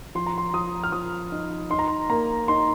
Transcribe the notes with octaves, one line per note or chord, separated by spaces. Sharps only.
F3 C6
A#5
C6
F3 D#6
F6
F3 D#6
D#4
D#4 C6
A#5
C6
A#3 A#5
D#4 C6